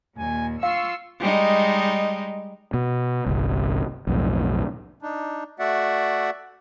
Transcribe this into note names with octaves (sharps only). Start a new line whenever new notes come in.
D#2 A#2 G#5
F4 F5 C#6 E6 C7
G3 G#3 D#4
B2
G1 C2
B1 F2 A2
D4 D#4
A3 F#4 D5 E5 F#5